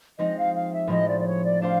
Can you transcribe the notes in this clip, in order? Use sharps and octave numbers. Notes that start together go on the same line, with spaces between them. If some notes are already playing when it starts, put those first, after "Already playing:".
F3 G#3 C4 D#4 D#5
F5
F5
E5
A2 F3 G#3 C4 D#5
D5
D5
C#5
D5
A3 D4 G4 C5 F5